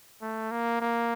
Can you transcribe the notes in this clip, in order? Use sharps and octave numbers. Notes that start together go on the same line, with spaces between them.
A3
A#3
A#3